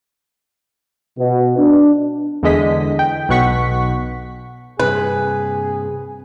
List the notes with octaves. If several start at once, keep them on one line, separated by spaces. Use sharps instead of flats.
B2
D4
E2 D3 G#3 D#5 B6
G5
B1 B2 F#5 C#6 B6
G2 C3 G#4 B4